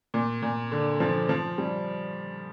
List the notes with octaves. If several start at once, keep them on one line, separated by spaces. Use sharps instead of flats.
A#2
A#2
D3
F3
F3
G3